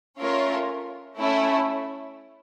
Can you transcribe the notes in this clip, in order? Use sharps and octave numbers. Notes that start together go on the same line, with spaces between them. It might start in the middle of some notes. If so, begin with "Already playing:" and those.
A3 C#4 F4 A#4 C#5
A3 C#4 E4